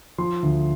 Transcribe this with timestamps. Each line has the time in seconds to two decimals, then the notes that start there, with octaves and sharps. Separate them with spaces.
0.18 F3 C6
0.43 D2